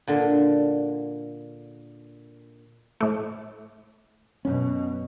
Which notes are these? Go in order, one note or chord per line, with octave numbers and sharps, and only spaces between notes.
A#2 D3
A2 A3
F#2 B2 C#4